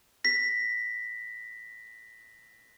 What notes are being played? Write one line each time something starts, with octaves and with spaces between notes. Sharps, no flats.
A#6 B6